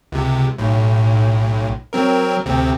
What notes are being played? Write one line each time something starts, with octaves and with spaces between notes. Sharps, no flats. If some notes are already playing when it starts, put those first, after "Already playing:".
C#2 C3
B1 A2
F#3 C4 A#4
D2 C3 C4